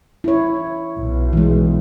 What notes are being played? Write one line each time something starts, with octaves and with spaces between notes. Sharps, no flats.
E4 C#5
B1
E3 G#3